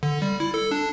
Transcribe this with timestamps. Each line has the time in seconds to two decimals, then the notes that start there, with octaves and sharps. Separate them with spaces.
0.03 D3
0.22 G3
0.40 E4
0.54 A4
0.71 D4